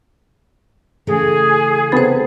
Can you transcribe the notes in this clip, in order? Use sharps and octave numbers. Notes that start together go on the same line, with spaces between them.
C#3 E3 A3 G#4
C3 B3 A4 C5 B5